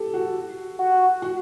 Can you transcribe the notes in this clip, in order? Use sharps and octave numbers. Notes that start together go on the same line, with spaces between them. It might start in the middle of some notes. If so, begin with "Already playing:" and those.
Already playing: G4 A4
F#4
F#4
F#4